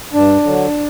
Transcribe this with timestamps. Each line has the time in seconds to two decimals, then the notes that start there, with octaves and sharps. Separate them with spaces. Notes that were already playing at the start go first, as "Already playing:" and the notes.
0.13 G2 D4
0.44 D3 F#3